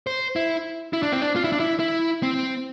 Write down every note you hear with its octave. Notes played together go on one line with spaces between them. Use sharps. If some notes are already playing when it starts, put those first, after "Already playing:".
C5
E4
E4
D4
C4
D4
F4
E4
D4
E4
E4
C4